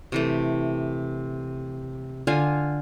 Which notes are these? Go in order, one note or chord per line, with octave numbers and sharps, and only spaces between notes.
C3 E3 A3
D3 F4 F5 G#5